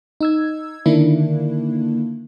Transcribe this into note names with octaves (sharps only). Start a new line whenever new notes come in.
D#4 E6 G#6
D3 D#3 A#3 D4 E4